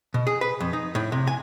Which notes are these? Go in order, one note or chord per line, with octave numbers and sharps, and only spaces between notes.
B2
G#4
B4
F2
D#4
A2
C3
G#5